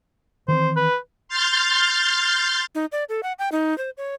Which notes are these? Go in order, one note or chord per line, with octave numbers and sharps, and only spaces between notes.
D#3 E3 C4 C5
B4
C6 F6 G6 A6
D#4
D5
A4
F#5
G5
D#4
C5
C#5